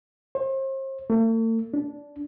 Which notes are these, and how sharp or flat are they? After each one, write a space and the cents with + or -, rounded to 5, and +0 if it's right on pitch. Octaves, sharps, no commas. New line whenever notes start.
C5 +40
A3 +45
D4 -15